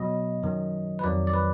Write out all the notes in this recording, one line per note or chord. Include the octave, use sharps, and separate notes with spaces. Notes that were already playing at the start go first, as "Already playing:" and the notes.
Already playing: B2 F#3 D#5
F#2 D#3 F#3
B4
F2 D#3 F#3 D5
D5
B4